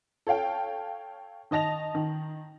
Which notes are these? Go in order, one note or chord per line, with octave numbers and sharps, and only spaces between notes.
A4 C#5 F5 G5
D#3 D#5 A5 A#6 F7
D#3